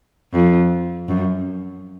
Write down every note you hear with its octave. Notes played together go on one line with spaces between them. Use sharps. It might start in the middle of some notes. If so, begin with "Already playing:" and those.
F2
F#2